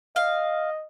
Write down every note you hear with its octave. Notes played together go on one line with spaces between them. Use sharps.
D#5 F5